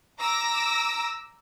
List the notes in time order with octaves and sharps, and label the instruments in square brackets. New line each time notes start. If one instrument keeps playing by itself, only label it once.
[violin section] A#5 D6 E6 A#6